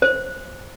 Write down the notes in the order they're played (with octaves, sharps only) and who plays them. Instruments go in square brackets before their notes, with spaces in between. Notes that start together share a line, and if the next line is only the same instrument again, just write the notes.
[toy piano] C5